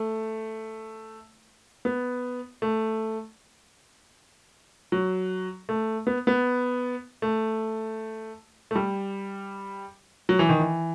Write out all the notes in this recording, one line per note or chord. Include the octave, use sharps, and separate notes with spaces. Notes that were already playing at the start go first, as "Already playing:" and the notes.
Already playing: A3
B3
A3
F#3
A3
B3
B3
A3
A3
G3
F#3
E3
D#3
E3